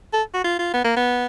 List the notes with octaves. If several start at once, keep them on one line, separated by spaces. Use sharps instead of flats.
A4
F#4
F4
F4
B3
A#3
B3